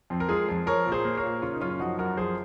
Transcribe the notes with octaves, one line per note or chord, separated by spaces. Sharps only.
F2 C4
A#4
G#3 F4 G#4
F2
F3 A#4 C#5
A#2
G#4 C5
A#3
A#4 C#5
A#2
C#3 C#4 F4
D#4
F#2 C#4 F4
F3 D#4 F#4
F#2 F#4 A#4
F3 G#4 C5